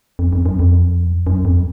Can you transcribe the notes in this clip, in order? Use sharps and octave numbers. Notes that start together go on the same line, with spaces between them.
F2
F2
F#2
F2
F#2
F2